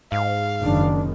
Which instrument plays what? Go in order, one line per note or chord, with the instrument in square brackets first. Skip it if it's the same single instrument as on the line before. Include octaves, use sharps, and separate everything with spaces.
[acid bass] G#2 [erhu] F5
[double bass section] F#1 D#3 [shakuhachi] D4